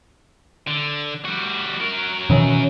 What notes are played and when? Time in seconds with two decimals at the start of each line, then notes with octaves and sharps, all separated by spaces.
0.67 D3
1.25 G3 F#4
1.80 F#3 A#4
2.30 B2 D#3 E3 C#4